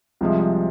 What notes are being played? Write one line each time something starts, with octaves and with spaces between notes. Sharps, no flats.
C2 C3 F3 G#3